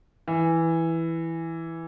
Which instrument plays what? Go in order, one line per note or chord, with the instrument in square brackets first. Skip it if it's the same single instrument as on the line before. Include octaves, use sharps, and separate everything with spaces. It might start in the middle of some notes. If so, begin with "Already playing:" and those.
[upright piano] E3